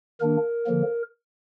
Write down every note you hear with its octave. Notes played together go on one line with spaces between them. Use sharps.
D#3 A#3 D4 A#4
D3 F3 A#3